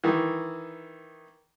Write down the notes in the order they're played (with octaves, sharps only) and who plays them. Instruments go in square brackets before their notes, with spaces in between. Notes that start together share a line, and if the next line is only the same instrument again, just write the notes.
[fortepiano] D#3 E3